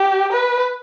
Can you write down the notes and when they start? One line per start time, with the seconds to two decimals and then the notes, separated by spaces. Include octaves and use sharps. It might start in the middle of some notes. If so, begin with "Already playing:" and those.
Already playing: G4
0.32 B4